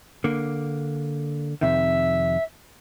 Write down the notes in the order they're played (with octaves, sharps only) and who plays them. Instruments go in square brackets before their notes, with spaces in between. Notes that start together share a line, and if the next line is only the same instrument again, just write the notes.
[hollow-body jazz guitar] D3 A#3
[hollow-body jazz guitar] F2 C3 D#3 [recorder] E5